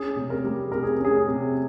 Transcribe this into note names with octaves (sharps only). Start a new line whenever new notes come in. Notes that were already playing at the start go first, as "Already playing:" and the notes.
Already playing: C#4 G#4
C3
A#4
G3
C3 A#4
G#4
C#4 G#4
C3